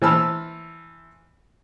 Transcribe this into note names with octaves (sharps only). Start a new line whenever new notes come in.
E3 C5 A5 B5 E6 F6